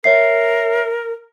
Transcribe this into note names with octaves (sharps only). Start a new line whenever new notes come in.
A#4 C#5 E5 C7